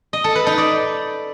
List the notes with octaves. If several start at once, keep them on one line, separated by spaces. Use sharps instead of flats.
D#5
A4
B4
D#4
D5